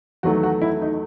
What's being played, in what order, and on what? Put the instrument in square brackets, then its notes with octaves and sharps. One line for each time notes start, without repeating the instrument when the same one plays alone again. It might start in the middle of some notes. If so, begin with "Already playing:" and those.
[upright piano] E2 D#3 F#3 A3 F#4
F#4
E4
D#4